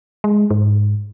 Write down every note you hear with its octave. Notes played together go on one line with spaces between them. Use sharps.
G#3
G#2